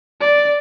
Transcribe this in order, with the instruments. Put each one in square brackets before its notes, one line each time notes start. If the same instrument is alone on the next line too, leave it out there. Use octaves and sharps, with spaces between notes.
[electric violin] D5